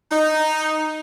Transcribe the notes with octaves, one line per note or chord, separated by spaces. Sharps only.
D#4